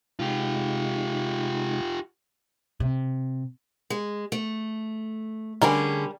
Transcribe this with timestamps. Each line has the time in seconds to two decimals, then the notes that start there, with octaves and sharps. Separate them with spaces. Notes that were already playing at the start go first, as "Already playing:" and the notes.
0.19 C3 G#3 D#4 F4 G4
2.80 C3
3.90 G#3
4.32 A3
5.62 D3 G3 C#4 G#4 A#4 G#5